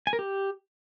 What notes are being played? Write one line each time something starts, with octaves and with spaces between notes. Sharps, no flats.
G#5
A#4
G4